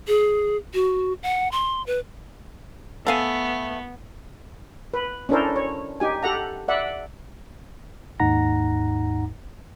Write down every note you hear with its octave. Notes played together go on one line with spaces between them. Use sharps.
G#4
F#4
F#5
C6
B4
A3 B3 F5 G#5
B4
C#4 D4 E4 A4 A#4 C5
C#5
D#4 G4 G#5
G4 A4 F#5 A#5
D5 E5 F#5
D#2 G#2 D#4 F#5 A#5 A#6